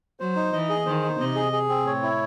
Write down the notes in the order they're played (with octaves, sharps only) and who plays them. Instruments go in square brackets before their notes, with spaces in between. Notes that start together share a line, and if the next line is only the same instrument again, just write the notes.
[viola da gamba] F#3 [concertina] C5
[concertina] D#4
[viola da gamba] E3 [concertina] D#5
[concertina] G#4
[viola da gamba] D#3 [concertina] C5
[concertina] D#4
[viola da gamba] C3 [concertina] D#5
[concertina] G#4
G#4
C4
[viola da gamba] A2 [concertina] C#5
[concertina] E4